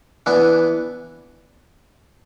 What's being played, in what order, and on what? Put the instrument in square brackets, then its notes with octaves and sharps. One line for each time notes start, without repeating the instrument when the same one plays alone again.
[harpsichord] E3 B3 D4